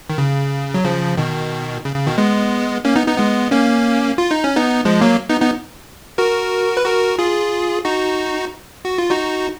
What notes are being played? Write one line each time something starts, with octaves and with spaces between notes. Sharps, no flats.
D#3
C#3
F#3
C#3 F3
B2 D#3
C#3
C#3
B2 D#3
G#3 B3
A#3 C#4
B3 D#4
B3 D#4
G#3 B3
A#3 C#4
F4
D#4
C#4
B3 D#4
F3 G#3
F#3 A#3
B3 D#4
B3 D#4
F#4 A#4
B4
F#4 A#4
F4 G#4
D#4 F#4
F#4
F4
D#4 F#4